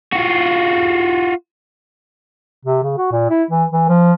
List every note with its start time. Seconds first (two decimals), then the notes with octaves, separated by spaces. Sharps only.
0.13 F4 F#4
2.65 C3
2.83 C#3
2.98 F#4
3.12 A#2
3.30 E4
3.51 E3
3.72 E3
3.89 F3